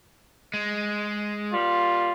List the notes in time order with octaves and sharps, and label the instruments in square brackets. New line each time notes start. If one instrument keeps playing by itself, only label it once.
[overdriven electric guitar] G#3
[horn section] A#2 G3 F4